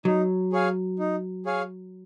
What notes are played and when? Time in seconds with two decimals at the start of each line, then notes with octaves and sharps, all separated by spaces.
0.05 F#3 D#4
0.52 G#4 C#5 F5 G#5
0.99 D#4
1.46 G#4 C#5 F5 G#5